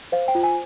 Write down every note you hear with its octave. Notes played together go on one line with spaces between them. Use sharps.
C5 F5
G5
F4
G#5